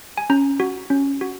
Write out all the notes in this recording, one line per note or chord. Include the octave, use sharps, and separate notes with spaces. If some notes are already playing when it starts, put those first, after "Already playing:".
G#5
C#4 A#5
F#4
C#4
F#4